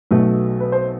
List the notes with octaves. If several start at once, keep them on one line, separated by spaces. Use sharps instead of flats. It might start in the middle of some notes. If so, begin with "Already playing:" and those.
B1 B2 A3
B4
C5